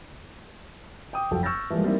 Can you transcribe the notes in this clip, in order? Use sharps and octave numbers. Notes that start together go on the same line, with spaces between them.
G5 D6 D#6
F1 F3 F#3 A4 G5
C#6 E6 F6 G6 A6 A#6
E3 F3 G3 G#3 A#3
G3 A#3 C4 D#4 E4